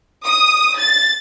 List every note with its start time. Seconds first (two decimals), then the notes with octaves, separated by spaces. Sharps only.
0.24 D#6
0.78 A6